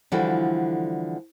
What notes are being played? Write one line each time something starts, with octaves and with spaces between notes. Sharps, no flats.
D3 E3 F3 G3 F#4 A4